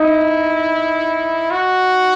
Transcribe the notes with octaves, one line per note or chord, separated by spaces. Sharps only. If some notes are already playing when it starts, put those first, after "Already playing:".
Already playing: D#4 E4 D#5
F#4